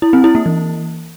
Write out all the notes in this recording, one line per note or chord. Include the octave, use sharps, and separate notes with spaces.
E4
C4
E4
A#3
E3